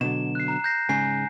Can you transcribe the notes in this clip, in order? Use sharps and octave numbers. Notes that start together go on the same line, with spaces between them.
B2 D3 F#3 E7
F#6 C7
A#5 F#6
G6 A#6 C7
G#2 C#3 G#5 C7